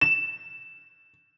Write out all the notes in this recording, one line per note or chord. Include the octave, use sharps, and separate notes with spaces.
E7